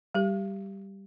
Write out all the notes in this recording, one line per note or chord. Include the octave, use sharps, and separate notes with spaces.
G3 G4